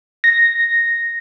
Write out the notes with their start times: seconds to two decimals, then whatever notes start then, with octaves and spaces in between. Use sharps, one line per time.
0.24 A#6